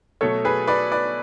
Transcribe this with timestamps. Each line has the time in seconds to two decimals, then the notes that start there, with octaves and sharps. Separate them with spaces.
0.21 B2 F#3 A3 A4 C#5
0.45 G#4 B4
0.68 B4 D5
0.92 B4 D5